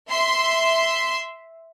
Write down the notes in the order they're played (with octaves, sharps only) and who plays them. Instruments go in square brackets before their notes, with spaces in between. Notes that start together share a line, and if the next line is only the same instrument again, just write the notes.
[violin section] E5 C6